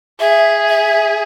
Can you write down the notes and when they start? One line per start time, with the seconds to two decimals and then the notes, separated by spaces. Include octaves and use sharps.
0.20 G#4 E5
0.69 E5